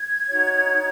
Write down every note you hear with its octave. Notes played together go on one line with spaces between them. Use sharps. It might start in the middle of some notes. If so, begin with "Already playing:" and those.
Already playing: G#6
D#4 F#4 C#5